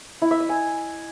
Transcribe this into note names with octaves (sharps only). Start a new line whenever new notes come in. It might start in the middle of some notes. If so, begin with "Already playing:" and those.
E4
E5
D#5
G#5